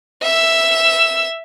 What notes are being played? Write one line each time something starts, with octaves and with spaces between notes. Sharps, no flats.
E5 E6